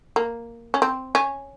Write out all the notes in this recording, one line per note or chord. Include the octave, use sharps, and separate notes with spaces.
A#3
C#4
C4
C#4